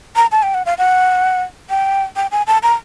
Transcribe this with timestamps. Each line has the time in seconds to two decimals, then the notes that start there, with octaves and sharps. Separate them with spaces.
0.16 A#5
0.32 A5
0.43 G5
0.54 F#5
0.66 F5
0.78 F#5
1.70 G5
2.16 G5
2.32 G#5
2.47 A5
2.63 A#5